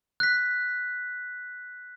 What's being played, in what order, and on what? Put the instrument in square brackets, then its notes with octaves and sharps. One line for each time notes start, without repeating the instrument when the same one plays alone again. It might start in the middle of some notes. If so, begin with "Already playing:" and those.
[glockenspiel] F#6 B6